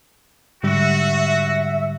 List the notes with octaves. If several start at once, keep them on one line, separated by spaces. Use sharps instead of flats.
G#2 D3 G3 F#4 E5